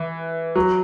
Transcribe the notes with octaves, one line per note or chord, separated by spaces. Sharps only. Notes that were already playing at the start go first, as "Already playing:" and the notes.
Already playing: E3
F#3